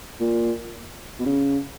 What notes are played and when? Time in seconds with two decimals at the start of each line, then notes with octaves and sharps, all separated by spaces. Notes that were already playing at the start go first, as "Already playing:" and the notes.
0.20 A#2
1.19 B2
1.26 C#3